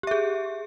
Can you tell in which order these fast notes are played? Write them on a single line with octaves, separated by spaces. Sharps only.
G4 E5 G#4